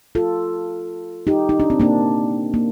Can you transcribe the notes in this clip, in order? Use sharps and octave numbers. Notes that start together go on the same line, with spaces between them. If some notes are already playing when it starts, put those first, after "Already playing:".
F4 A4
D#4 G4
D#4
D4
C4
A#3 D4
A#3